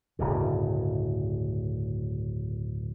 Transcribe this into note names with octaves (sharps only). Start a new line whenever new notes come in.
D1 G2 C#3